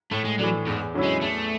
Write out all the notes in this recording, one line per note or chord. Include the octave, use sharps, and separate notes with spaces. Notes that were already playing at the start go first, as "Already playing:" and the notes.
A2 A3
G#3
E3 F#3 A3 D4
E2 G#2
D3 F#3 C#4 E4
G#3
E2 A3